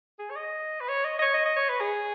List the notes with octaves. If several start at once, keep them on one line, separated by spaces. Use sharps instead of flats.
G#4
C#5
D#5
B4
C#5
D#5
D#5
C#5
D#5
D#5
C#5
B4
G#4